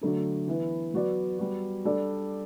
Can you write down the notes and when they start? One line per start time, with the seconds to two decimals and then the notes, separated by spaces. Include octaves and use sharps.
0.01 D3 F#3 A3 D4
0.47 E3 B3 E4
0.94 F#3 B3 F#4 B4 D5
1.39 G3 B3 F#4
1.85 G3 D4 A4 D5